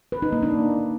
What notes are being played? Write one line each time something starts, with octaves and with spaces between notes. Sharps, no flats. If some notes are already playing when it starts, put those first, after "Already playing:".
B4
D#4
A#3
D4